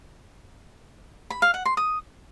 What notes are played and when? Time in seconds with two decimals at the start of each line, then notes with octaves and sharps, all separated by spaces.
1.30 B5
1.42 F5
1.54 F#5
1.65 C6
1.77 D#6